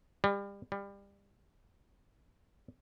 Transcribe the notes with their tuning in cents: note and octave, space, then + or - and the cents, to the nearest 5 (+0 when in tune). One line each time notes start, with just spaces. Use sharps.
G3 +30
G3 +25